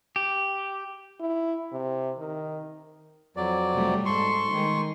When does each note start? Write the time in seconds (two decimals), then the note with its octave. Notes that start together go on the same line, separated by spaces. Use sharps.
0.16 G4
1.20 E4
1.72 C3
2.18 D#3
3.37 F2 F#3 D5
3.74 C3 G3 A3
4.06 G#2 A4 C6 C#6
4.52 D#3 G#3